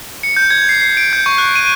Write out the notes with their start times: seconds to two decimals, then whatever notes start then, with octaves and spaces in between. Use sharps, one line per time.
0.23 C#7
0.36 G6
0.50 G#6
0.69 C7
0.82 C7
0.97 D7
1.13 G6
1.26 C#6
1.38 F#6
1.55 D#7